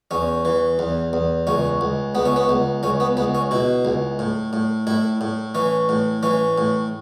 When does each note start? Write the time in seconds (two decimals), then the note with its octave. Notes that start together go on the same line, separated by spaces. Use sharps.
0.11 E2 C#4
0.45 E3
0.79 E2
1.13 E2
1.47 C#2 C#4
1.81 C#2
2.15 C#2 B3
2.25 C#4
2.36 B3
2.49 C#2
2.83 C#2 C#4
3.00 B3
3.17 C#2 B3
3.35 C#4
3.51 B2 E4
3.85 C#2
4.19 A2
4.53 A2
4.87 A2 E4
5.21 A2
5.55 E3 C#4
5.89 A2
6.23 E3 C#4
6.58 A2